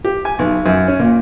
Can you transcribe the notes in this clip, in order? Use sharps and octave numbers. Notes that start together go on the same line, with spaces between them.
G4
G#5
B1
F#2
C#4
A#2